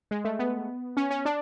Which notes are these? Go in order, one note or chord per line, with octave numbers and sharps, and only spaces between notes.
G#3
A3
B3
C#4
C#4
D4